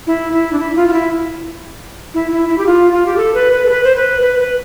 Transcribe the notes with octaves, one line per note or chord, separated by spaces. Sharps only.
E4
E4
D4
E4
F4
F4
E4
E4
E4
E4
G4
F4
F4
G4
A4
B4
B4
A4
B4
C5
B4
B4
B4